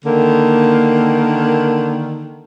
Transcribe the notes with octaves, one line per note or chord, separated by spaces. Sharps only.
D3 D#3 A#3